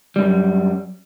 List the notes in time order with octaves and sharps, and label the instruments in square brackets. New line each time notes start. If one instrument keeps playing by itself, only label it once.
[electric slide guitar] F#2 G3